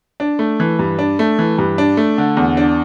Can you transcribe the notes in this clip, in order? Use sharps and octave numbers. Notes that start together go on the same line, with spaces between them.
D4
A3
E3
G2
D4
A3
E3
G2
D4
A3
D3
E2
D4